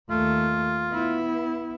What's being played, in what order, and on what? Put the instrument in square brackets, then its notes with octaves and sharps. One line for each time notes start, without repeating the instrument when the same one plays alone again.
[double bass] D#2 A3 [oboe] F4
[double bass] B3 E4